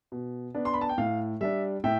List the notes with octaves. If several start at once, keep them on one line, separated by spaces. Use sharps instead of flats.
B2
B3 D4
C6
B5
A5
G5
A2 F5
G3 D4 E5
A2 E5 G5